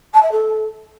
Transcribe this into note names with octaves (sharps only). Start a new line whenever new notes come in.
A5
E5
A4